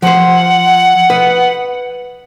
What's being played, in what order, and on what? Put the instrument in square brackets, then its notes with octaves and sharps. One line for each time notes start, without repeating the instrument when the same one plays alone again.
[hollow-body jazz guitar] F3 C5 [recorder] F#5
[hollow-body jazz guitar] B4 D#5